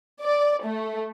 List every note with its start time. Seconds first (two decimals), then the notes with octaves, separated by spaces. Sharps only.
0.22 D5
0.64 A3